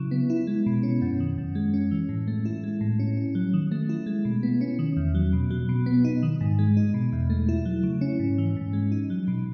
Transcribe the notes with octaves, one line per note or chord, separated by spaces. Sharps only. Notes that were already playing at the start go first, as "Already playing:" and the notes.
Already playing: C#3 F#3 E4
B3
E4
G#3
B2
C#4
F#2
D#3
F#2
G#3
C#4
E3
A2
A3
E4
G#3
A2
C#4
C#4
F#3
D#3
A3
E4
G#3
B2
B3
C#4
D#3
E2
F#3
B2
F#3
B2
B3
D#4
D#3
G#2
G#3
D#4
B2
E2
A3
E4
F#3
C#3
C#4
G#2
E3
G#2
G#3
D#4
F#3
B2